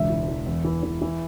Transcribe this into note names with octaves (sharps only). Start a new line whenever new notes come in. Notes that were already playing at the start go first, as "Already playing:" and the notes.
Already playing: E1 C#2 E5
E3
E3
E2
E3
E3
E3